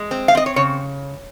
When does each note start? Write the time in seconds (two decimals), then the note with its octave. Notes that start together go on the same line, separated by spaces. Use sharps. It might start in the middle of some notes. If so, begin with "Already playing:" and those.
Already playing: G#3
0.11 C4
0.28 F5
0.35 C4 D#5
0.46 C#5
0.56 C#3 C#5